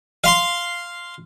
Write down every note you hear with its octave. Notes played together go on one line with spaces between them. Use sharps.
F5 C6